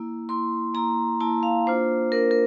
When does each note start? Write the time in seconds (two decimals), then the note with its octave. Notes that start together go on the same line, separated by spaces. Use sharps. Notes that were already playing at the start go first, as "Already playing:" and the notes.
Already playing: A#3 E4
0.29 A#3 E4 C6
0.74 A#3 E4 A#5
1.21 A#3 E4 A5
1.43 F5
1.67 A#3 D4 F4 C5
2.12 A#3 D4 F4 A#4
2.31 A#4